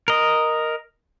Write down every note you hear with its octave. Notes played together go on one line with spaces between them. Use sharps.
A#4 D#5